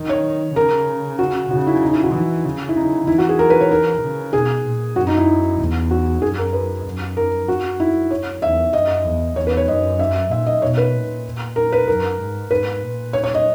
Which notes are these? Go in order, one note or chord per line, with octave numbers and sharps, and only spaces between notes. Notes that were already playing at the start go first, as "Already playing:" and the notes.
Already playing: D#3
C#5
C#3 A#4
F#4
C#3 F#4
E4
D#4
E4
F#4
E3 E4
C#3
E4
D#4
E3 E4
F#4
G#4
A#4
B4
C#5
A#4
C#3
B2 G#4
A#2
F#2 F#4
D#4
E4
E2
F#4
F#2 G#4
A#4
B4
F#2
A#4
F#2 F#4
E4
C#5
E2 E5
F#2 D#5
E2
E2 C#5
B4
C#5
F#2 D#5
E5
A#2 E5
D#5
B2 C#5
B4
A#2
A#4
B4
F#2 A#4
G#2
G#2 B4
A#2
C#5
C#5
D#5